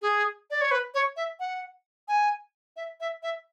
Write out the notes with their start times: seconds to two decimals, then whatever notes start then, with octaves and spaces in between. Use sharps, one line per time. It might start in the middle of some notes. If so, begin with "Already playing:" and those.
0.02 G#4
0.50 D5
0.61 C#5
0.71 B4
0.94 C#5
1.17 E5
1.40 F#5
2.08 G#5
2.76 E5
3.00 E5
3.23 E5